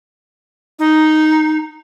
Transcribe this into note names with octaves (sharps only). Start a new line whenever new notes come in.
D#4